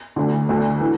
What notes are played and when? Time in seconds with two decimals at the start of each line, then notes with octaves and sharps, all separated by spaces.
0.16 D2 D3
0.49 D2 D3
0.81 E3